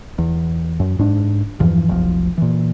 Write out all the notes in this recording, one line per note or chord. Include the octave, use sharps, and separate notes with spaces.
E2
F#2
G#2 D4
E2 G2 E3 F3
F1 B1 F3
A#2 E3